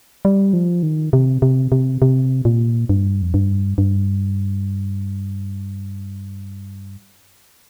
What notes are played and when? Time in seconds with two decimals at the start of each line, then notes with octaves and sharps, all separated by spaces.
0.25 G3
0.53 F3
0.83 D#3
1.13 C3
1.42 C3
1.72 C3
2.02 C3
2.45 A#2
2.89 G2
3.22 F2
3.34 G2
3.78 G2